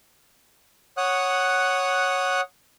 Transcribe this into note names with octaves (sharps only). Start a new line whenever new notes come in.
C#5 F#5 D#6 F#6